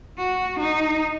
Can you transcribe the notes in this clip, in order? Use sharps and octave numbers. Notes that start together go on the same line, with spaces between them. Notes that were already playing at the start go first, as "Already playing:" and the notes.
F#4
D#4